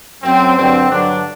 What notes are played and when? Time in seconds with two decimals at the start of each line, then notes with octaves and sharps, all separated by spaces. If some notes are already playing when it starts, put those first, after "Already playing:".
0.23 F#2 F#3 C4
0.56 G2 D3 F#3 C4
0.89 G2 D3 F#3 D4